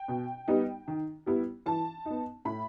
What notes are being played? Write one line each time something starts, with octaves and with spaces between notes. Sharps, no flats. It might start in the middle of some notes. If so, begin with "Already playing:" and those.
Already playing: G5
B2
G3 B3 D#4
D#3
G3 B3 E4
E3 A5
B3 D#4
A2 B5